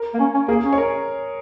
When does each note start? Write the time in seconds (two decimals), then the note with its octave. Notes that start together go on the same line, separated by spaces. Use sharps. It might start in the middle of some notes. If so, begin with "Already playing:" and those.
Already playing: A#4
0.14 A#3
0.19 C#4
0.34 C#4
0.48 A#3 G#4
0.64 C#4
0.73 C#5
0.78 A#4